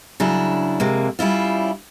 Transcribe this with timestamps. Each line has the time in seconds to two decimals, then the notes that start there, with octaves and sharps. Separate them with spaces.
0.20 C#3 F#3 D4 E4
0.80 F2 C3 G#3 A#3
1.19 G3 C#4 E4 F4